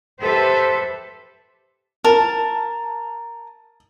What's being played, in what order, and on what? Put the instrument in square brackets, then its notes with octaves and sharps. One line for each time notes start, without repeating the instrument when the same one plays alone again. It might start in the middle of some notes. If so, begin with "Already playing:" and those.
[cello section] G4 A4 B4 C5 E5
[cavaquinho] A#4 [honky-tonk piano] A5